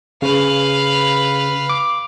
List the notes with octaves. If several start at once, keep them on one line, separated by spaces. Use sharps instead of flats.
C#3 B4 F5
D6